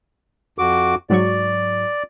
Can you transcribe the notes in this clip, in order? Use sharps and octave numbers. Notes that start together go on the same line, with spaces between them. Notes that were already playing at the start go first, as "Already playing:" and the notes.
F2 F#4 D6
G#2 F#3 D5 C#6